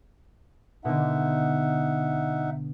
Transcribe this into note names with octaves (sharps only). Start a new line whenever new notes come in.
B2 D3 D#4 E5 F#5